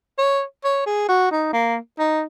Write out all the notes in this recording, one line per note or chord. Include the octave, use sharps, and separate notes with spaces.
C#5
C#5
G#4
F#4
D#4
A#3
D#4